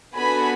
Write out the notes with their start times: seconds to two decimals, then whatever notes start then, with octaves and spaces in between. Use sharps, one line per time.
0.16 B3 D4 F#4 A4 G#5 B5